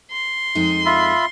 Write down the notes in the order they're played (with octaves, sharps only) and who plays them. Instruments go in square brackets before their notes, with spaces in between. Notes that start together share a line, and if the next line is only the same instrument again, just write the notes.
[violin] C6
[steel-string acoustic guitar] F2 G#3 D#4
[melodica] F4 E5 B5